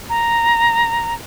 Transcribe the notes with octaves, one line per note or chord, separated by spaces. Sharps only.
A#5